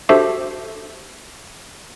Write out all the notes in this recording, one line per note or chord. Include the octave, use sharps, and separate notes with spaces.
D4 F#4 G4 A4 C5 E5